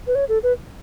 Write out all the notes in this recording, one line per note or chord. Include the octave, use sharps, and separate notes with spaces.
B4
C#5
A4
B4